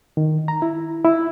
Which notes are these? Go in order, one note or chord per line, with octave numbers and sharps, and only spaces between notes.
D#3
A#5
E4
E4